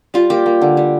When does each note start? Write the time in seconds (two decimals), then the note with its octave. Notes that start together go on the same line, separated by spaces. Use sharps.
0.14 G3 F4
0.30 A#3 G4
0.46 A#3
0.61 D3
0.77 G3